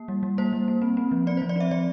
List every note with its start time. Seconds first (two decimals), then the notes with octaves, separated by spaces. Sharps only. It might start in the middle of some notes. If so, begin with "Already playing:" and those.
Already playing: A#3
0.08 G3
0.23 G3
0.38 A#3 C5
0.53 G3
0.68 A#3
0.82 C4
0.97 C4
1.12 F3
1.27 C4 D5
1.37 C5
1.42 F3
1.49 D5
1.56 C4 E5
1.71 F3 D5